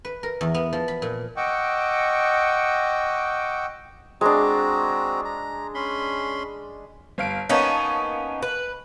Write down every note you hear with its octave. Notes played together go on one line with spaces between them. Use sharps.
B4
A#4
E2
B3
F3
B5
A#2
D#5 F#5 G5 C#6 D6 E6
G#3 C4 D4 F#4 A#5
A#5
C#4 B5 C6
G1 F5 D7
A#3 B3 C#4 D#4 C#5 A5
B4